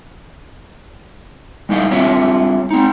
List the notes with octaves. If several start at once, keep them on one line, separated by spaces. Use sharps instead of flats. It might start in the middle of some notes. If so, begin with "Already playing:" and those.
G3 D#4 E4 D#5 F5
G3 C4 D4 F4 C#5 E5
C4 D#4